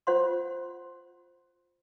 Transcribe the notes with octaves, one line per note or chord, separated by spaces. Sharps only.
F4 C5 F#5 C6